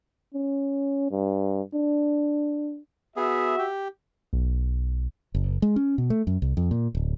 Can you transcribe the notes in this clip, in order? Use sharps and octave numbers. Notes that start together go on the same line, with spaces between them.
C#4
G2
D4
B3 F#4 G#4 E5
G4
B1
F#1
G#3
C#4
B2
A3
F#2
C2
F2
A#2
D1